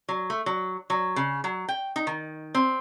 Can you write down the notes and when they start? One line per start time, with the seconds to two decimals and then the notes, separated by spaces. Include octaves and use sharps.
0.09 F#3
0.30 A3
0.46 F#3
0.90 F#3
1.16 C#3
1.44 F#3
1.68 G5
1.96 D#4
2.07 D#3
2.55 C4